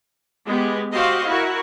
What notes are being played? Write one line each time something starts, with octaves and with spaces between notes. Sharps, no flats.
G#3 B3 G4
F#4 G4 C5 D#5 F5
E4 F#4 A#4